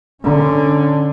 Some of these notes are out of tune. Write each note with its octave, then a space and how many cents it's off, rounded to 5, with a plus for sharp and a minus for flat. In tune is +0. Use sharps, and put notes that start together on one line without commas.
D3 +10 C#4 +0